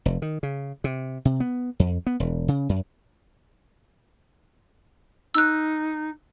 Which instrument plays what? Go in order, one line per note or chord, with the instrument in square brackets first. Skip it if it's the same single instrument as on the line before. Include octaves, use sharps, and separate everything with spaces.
[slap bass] F1
D#3
C#3
C3
C3
B3
F2
B3
E1
C#3
F#2
[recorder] D#4 [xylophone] E6 F#6